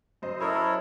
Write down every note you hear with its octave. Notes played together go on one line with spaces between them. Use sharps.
F#2 C5 D#5
E4 A4 A#4 C#5 B5 D#6